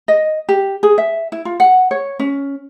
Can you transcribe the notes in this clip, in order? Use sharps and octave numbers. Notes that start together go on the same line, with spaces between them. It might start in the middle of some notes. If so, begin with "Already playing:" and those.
D#5
G4
G#4
E5
E4
F4
F#5
C#5
C#4